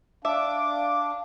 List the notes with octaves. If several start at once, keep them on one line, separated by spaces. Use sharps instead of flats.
D4 E5 F5 D6